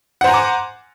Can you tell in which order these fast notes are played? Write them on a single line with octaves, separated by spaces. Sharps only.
F#5 C5 A#5 G#5 D6